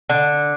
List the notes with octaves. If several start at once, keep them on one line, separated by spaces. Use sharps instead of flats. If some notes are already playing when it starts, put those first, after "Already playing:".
D3